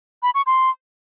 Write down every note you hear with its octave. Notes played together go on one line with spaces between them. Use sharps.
B5
C#6
C6